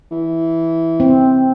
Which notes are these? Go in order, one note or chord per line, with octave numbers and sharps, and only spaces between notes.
E3
C4